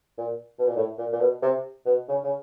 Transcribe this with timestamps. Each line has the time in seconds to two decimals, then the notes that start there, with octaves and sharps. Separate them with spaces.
0.18 A#2
0.59 B2
0.67 A#2
0.77 A2
0.98 A#2
1.13 A#2
1.20 B2
1.42 C3
1.86 B2
2.09 C#3
2.24 C#3